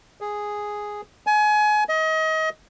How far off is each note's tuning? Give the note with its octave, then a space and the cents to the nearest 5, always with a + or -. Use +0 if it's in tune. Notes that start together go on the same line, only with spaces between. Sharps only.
G#4 +0
G#5 +30
D#5 +30